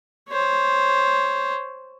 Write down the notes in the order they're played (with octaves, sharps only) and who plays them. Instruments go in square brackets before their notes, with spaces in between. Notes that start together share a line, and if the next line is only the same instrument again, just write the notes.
[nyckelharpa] C5 C#5